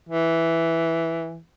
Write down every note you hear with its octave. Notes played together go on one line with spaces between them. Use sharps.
E3